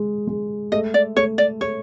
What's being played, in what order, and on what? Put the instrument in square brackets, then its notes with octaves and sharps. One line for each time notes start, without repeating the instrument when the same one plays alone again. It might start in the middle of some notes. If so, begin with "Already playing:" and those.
Already playing: [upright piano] G#3
G#3
[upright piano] A3 [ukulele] D#5
[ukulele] D5
[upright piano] A3 [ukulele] C#5
[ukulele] D5
[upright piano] A3 [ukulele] C#5